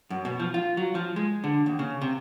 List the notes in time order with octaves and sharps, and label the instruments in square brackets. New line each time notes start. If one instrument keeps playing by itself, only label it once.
[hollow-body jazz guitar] F#2
B2
F3
F4
F#3
F3
G#3
D3
D#2
C#3
C3